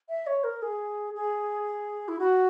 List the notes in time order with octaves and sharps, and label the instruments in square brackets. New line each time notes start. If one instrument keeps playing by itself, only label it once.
[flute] E5
C#5
A#4
G#4
G#4
E4
F#4